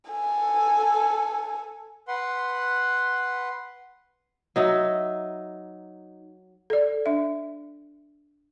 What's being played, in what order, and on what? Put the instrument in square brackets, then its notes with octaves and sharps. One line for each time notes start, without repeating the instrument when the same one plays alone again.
[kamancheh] A4 G#5
[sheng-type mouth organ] B4 F#5 C6
[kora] F#3 D#4 E5
[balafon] A4 D5
D4 E5